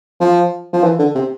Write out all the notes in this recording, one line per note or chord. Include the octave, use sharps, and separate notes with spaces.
F3
F3
E3
D3
C3